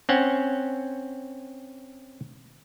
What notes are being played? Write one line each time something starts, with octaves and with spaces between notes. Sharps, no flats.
C4 C#4 F#5